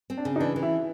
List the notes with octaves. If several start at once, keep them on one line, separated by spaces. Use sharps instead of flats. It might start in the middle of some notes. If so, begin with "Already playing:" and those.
C4
D4
C#3
D#4
E3 D4
E3
E4